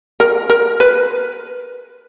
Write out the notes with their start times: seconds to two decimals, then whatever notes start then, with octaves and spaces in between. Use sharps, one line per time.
0.20 A#4
0.50 A#4
0.80 B4